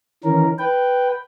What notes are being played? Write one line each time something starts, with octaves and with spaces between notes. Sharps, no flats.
D#3 E3 C#4 A#4
B4 G5